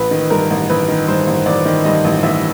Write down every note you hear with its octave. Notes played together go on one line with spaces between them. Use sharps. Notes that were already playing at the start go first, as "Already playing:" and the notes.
Already playing: A1 B4
D#3
G2 A#4
A1
A1 B4
D#3
G2 C5
A1
A1 D5
D#3
G2 D#5
A1
A1 E5